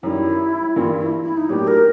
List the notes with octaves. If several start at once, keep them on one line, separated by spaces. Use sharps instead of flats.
F#2 D#3 G3 E4
G2 E3 G3 A#3 F4
E4
E4
D#4
A2 F#3 A#3 D4 G4
A#4